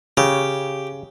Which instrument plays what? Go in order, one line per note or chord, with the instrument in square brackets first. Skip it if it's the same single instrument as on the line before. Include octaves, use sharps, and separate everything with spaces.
[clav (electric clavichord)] C#3 [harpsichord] G4